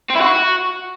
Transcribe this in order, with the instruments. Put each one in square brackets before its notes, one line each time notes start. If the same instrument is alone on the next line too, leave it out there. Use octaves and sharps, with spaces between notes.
[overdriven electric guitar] C4
E4
F#4